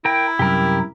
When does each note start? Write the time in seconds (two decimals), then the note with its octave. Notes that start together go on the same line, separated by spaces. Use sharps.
0.05 E4 A#4 G5
0.39 C2 F#2 G4 A#4